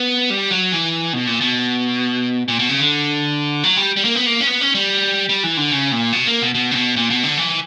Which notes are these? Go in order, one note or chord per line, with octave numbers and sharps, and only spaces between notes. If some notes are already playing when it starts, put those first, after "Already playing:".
Already playing: B3
G3
F#3
E3
B2
A#2
B2
A#2
B2
C#3
D3
F#3
G3
G3
A#3
B3
A#3
C#4
B3
C#4
G3
G3
E3
D3
C#3
A#2
B2
A#3
B2
B2
C#3
B2
A#2
B2
D3
E3